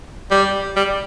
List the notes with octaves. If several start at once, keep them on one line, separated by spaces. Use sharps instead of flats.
G3
G3